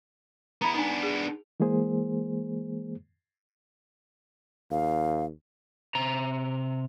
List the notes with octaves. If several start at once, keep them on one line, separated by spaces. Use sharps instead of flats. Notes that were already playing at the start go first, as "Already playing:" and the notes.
B3 E4 A#5 B5
B3 D4 D#4 G#5
G#4
E3 G#3 A#3 G#4 C5
D#2 F5
C3 A#5